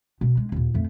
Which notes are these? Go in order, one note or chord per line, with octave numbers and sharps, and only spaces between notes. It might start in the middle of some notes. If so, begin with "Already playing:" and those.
B2
G#3
D#2 A#2
F2 A3